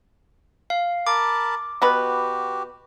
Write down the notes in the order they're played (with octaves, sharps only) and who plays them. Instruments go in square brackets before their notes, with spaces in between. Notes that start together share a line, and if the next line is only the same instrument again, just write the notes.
[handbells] F5
[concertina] A#4 A5 B5 [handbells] D6
[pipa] B2 B3 B4 [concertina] F#4 G4